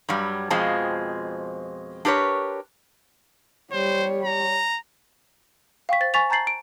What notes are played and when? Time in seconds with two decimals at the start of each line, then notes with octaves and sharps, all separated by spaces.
0.09 G2 F#3 G3
0.50 F2 B2 F3 G#3 C4 A5
2.05 D4 G4 A#4 B4 C#5
3.72 G3 C5 C#5
4.24 A#5
5.89 F5 G5 C#6 B6
6.00 C5 A6
6.14 G#5 C#6 A6 B6 F7
6.30 A5 A#5 G6 A6 C7 F#7
6.47 D7